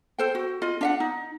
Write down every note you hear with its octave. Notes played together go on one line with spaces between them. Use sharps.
A4 C5 G5
F#4
F4 D#5
D4 E5 F#5
D#4